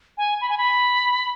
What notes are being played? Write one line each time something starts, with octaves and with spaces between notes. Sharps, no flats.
G#5
B5
G#5
B5